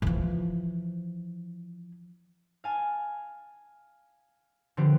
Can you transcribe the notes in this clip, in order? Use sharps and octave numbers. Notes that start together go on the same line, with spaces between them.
E3 F3
F5 G#5 A5
D3 F3 C4 G4 B4 C5